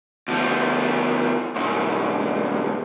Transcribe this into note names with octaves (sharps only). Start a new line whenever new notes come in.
D2 F3
C2 G#2